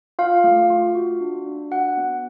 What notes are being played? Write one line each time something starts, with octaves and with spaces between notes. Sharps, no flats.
F4 F5
A3
F4
F#4
D4
D4
F#4 F#5
B3